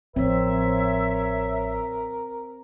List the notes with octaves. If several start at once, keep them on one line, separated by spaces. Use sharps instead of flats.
A1 F3 C4 A#4 C#5 E5